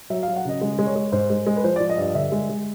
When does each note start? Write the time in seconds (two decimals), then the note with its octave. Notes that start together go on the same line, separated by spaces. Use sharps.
0.10 F#3 E5
0.23 F5
0.28 F#3
0.36 F#5
0.45 C#3 D#5
0.61 G#3 D#5
0.79 G#3
0.86 C#5
0.95 G#3
1.12 G#2 C5
1.30 G#3
1.46 G#3
1.56 B4
1.64 F3 C5
1.76 D5
1.80 F3
1.90 D#5
1.97 G2
2.02 D#5
2.14 D3 E5
2.32 G#3
2.49 G#3